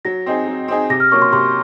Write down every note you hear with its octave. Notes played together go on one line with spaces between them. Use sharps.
F#3 A#6
C4 D#4 G#4
F#3
C4 D#4 G#4
C3 A#6
F6
F#3 A#3 C#4 C#6
C6
C3 C6